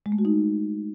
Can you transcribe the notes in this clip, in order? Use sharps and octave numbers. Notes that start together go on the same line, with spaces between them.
G#3
A3
F#4
D#4